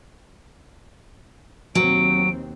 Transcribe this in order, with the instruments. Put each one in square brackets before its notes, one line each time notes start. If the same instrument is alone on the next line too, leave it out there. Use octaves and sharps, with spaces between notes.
[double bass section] D#2 B2 C4 [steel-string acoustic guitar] F#3 [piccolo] D7